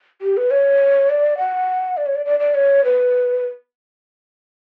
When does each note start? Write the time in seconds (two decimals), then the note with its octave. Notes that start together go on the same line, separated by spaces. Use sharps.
0.22 G4
0.37 B4
0.51 C#5
1.10 D5
1.38 F#5
1.97 D5
2.06 C#5
2.15 D5
2.25 D5
2.40 D5
2.55 C#5
2.84 B4